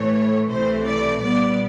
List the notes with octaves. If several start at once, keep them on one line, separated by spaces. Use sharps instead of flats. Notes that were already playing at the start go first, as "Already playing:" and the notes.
Already playing: A2 E3 A3 C#5
C2 C3 E3 A3 C5
D5
A#2 G3 B3 D5